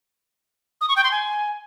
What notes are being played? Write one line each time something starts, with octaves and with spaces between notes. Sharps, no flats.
D#6
C#6
G5
C6
G#5